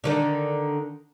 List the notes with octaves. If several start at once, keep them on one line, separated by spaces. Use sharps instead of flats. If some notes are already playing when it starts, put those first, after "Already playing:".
D3 D#3 D4